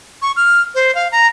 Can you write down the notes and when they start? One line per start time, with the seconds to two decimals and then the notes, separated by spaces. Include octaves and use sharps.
0.22 C#6
0.36 F6
0.75 C5
0.95 F5
1.12 A#5